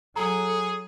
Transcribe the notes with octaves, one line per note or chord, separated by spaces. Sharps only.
F#3 G#4 A4 A#5